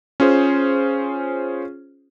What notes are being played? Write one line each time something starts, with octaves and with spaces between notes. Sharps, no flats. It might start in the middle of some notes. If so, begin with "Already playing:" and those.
C#4 F4 G#4 C5